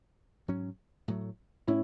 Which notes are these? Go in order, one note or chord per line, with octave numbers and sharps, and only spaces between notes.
G#2 F#3 C#4
A2 F#3 A3
A2 C#4 E4